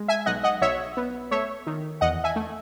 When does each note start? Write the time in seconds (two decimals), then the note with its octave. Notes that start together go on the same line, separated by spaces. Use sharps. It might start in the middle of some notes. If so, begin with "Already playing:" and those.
Already playing: G#3
0.08 E5 G#5
0.26 B1 D#5 F#5
0.43 D#5 F#5
0.61 B1 C#5 E5
0.97 B3
1.31 A3 C#5 E5
1.67 D#3
2.01 E2 D#5 F#5
2.24 E5 G#5
2.36 A3